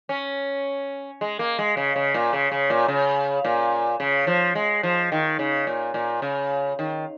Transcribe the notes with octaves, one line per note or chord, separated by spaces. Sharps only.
C#4
G#3
A#3
G#3
C#3
C#3
A#2
C#3
C#3
A#2
C#3
A#2
C#3
F3
G#3
F3
D#3
C#3
A#2
A#2
C#3
D#3